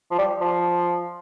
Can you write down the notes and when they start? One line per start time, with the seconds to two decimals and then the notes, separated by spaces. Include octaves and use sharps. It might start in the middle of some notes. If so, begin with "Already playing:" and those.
0.11 F3
0.18 G3
0.40 F3